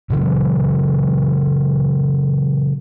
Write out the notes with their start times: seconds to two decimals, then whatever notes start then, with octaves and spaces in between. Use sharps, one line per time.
0.10 A#2 C#3 E3 F#3